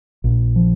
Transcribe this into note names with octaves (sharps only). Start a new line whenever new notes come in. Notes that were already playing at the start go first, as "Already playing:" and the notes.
A#1
F3